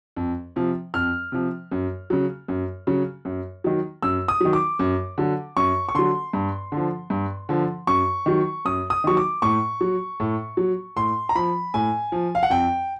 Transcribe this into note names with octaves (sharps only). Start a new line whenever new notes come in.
F2
C3 F3
F2 F6
C3 F3
F#2
C#3 F#3
F#2
C#3 F#3
F#2
D#3 F#3
F#2 E6
D#6
D#3 F#3
D6
F#2
D3 F#3
F#2 C#6
C#6
D3 F#3 C6
G2
D3
F3
G2
D3 F3
F#2 C#6
D#3 F#3
F#2 D#6
D#6
D#3 F#3 C#6
D6
A2 C#6
F#3
A2
F#3
A2 C6
A#5
F3 B5
A2 G#5
F3
F5
F#5
F2 G5